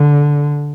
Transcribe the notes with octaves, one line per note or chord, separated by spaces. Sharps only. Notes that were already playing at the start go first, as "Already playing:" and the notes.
Already playing: D3